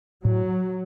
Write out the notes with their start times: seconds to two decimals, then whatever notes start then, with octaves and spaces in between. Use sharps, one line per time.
0.24 A2 F#3